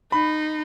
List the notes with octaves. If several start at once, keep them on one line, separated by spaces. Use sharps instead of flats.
D#4 B5